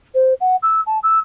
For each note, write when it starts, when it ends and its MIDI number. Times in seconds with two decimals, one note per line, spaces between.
0.14 0.34 72
0.41 0.56 78
0.63 0.81 88
0.87 0.99 81
1.03 1.19 88